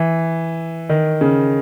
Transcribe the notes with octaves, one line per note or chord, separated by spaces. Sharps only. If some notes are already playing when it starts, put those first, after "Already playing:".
Already playing: E3
D#3
C#3